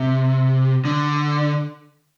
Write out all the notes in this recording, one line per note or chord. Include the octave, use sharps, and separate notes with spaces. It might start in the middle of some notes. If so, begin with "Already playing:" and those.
Already playing: C3
D3